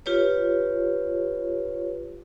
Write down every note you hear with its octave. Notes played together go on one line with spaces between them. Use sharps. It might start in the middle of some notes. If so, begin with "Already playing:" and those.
F4 G4 B4 C#5